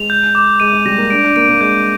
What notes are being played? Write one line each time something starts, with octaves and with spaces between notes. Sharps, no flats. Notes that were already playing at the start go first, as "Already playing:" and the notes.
Already playing: G#3 F7
G6
D6
G#3 D#7
G#3
G3 A#6
A#3
D4 D7
D4
A#3 D7
A#3
G#3 G6